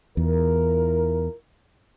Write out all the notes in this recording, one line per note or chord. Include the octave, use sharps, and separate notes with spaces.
E2 E4 F4 A#4